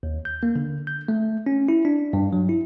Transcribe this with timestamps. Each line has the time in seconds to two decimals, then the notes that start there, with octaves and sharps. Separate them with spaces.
0.03 D#2
0.25 G6
0.43 A#3
0.56 D3
0.87 G6
1.08 A3
1.46 C#4
1.69 E4
1.85 D4
2.13 G2
2.33 F#3
2.49 E4